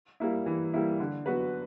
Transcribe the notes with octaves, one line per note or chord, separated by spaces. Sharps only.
G3 A#3 E4
E3
G3 A#3 E4
D3
F#3 B3 F#4 B4